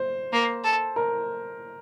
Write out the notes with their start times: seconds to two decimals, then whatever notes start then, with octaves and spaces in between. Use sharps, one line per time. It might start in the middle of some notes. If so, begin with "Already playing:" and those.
Already playing: C5
0.33 A#3
0.64 A4
0.96 A#4